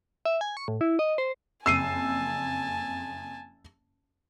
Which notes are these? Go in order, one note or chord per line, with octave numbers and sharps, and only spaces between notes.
E5
G#5
C#6
A2
E4
D#5
C5
F#1 F2 G#5 A5 E6 C7 D#7